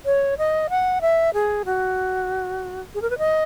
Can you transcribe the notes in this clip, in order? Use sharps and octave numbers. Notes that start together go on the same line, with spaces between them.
C#5
D#5
F#5
E5
G#4
F#4
G#4
A#4
B4
D#5